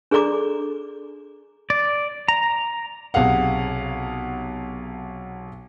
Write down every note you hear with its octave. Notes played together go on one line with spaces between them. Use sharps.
D4 G#4 A4 D5 A#5 D6
D5
A#5
B1 C3 G#4 F5 F#5